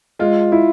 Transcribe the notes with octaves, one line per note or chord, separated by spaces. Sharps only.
G#3 F4
E4